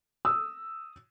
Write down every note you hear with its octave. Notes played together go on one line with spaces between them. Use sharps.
D#6 E6